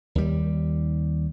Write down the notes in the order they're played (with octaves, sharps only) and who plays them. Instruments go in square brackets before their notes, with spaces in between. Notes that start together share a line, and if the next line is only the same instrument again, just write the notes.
[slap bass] D#2 G3